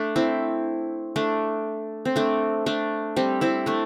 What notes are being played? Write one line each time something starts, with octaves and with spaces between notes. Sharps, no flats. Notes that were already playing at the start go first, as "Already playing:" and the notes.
Already playing: A3 D4
C4 E4
A3 D4
C4
A3 D4
A3 D4
G3 C4
C4 E4
A3 D4